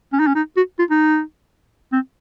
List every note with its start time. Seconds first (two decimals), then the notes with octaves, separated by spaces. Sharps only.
0.13 C#4
0.20 D#4
0.27 C#4
0.35 D#4
0.57 F#4
0.79 F4
0.90 D#4
1.92 C4